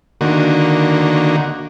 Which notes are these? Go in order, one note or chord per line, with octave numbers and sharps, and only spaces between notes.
D3 D#3 A#3 F#4